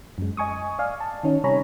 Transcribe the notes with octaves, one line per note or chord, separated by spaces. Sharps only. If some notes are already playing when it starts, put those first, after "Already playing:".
F#2 G#3
D#5 G#5 C#6 D#6
D5 F5 G#5
A5
D#3 C#4 D#4
C3 G3 C#5 G#5 A#5 B5